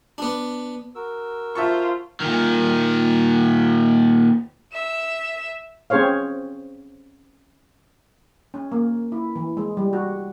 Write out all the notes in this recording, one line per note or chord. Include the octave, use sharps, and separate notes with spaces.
B3 D4
F#4 A#4 E6
F4 C5 E5 A5 C#6
A#2 D#3
E5 E7
C4 C#4 G#4 C5 C#5 F5
C#4
A#3
E4
E3
G#3
G3
F#4